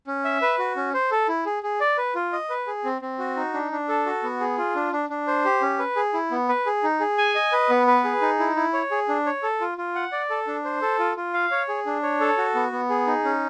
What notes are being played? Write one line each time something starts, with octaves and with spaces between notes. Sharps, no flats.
C#4
E5
B4
F#4
C#4
C5
A4
E4
G#4
G#4
D5
B4
F4
D#5
B4
G#4
C4
C4
F#4
D#4
D4
D4
A4
F#4
B3
G#4
F4
D4
D4
D4
C5
G4
C#4
B4
G#4
E4
B3
B4
G#4
D#4
G#4
G#5
D#5
B4
B3
B4
G#4
D#4
E4
E4
C#5
G#4
D4
C#5
A4
F4
F4
F#5
D5
A4
D4
C5
A4
F4
F4
F5
C#5
G#4
D4
C#5
A4
F#4
B3
B3
G#4
D#4
C#4